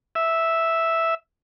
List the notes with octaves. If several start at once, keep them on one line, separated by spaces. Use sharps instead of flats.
E5